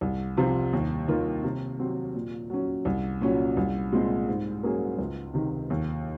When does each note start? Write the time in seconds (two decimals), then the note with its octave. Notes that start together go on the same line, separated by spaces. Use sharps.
0.01 C2
0.37 C3 F3 C4 F4
0.73 D#2
1.07 D#3 A#3 F4
1.43 C3
1.79 F#3 C4
2.15 A#2
2.50 F#3 C#4
2.85 C2
3.21 A#2 F#3 C#4
3.57 C2
3.92 A#2 G#3 C4
4.28 G#2
4.63 F#3 A#3 C#4 G#4
4.98 C#2
5.34 C3 D#3
5.70 D#2